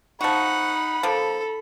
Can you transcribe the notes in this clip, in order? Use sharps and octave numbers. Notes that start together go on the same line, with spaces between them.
F3 D#4 F#4 F#5 B5
F3 A#3 A4